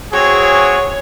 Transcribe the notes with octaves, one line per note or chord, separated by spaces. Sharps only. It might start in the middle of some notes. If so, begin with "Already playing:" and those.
C4 F#4 G#4 C#5